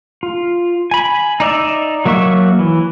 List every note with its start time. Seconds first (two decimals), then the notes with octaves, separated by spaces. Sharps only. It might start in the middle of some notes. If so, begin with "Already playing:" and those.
0.23 F4
0.91 G#5 B5
1.40 D#4 D5 E5
2.05 F#3 A#3 F#4 E5 C#6
2.59 E3